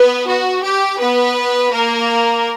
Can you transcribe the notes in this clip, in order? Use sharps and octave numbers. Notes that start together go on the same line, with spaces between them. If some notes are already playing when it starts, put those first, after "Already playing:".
Already playing: B3 B4
F#4
G4
B3 B4
A#3 A#4